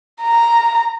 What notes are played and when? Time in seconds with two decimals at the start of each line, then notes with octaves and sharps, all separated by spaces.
0.23 A#5